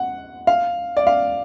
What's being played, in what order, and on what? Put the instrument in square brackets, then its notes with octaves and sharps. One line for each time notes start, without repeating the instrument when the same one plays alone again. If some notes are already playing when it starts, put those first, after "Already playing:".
Already playing: [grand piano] F#5
F5
D5
F5